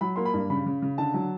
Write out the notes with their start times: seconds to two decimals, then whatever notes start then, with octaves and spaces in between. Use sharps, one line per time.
0.01 F#3 B5
0.16 A#3 C6
0.25 B5
0.34 G2
0.50 C#3 B5
0.66 C#3
0.82 C#3
0.98 D3 A5
1.14 F#3